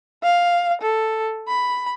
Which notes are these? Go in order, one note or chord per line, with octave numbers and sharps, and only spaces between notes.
F5
A4
B5